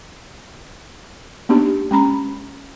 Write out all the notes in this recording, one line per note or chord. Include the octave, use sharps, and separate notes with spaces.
A#3 B3 D4 D#4 G4
G#3 C#4 A#5 B5